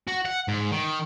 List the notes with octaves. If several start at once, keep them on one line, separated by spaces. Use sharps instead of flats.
F#4
F#5
G#2
D#3